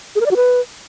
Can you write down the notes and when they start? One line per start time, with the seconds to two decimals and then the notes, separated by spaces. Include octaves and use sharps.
0.16 G#4
0.21 A#4
0.26 D5
0.31 F#4
0.36 B4